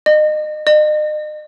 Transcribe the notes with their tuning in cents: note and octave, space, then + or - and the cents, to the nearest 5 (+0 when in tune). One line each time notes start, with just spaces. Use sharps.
D#5 -30
D#5 -40